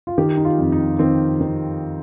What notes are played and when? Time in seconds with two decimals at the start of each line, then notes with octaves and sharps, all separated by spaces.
0.07 F4
0.18 D#3 G4
0.37 D#4
0.45 F4
0.59 F2
0.72 D#4
0.99 D#3 C4
1.41 D#3